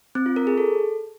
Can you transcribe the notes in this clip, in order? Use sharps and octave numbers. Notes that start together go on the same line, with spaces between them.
C4
F4
A#4
G#4
A4